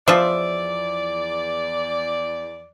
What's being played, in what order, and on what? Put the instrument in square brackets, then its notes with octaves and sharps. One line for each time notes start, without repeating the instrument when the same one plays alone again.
[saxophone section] E2 D5 [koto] F3 [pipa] F4 C5 E5